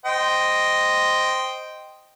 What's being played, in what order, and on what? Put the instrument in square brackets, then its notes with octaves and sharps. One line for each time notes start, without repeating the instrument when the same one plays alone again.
[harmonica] C5 D#5 G5